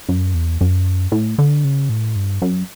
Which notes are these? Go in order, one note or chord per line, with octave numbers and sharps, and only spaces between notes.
F#2
E2
F#2
A2
D3
C#3
A2
G2
F#2